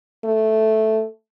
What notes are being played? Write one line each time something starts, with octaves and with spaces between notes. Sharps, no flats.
A3